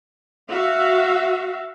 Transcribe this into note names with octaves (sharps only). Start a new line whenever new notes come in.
F#4 E5 F5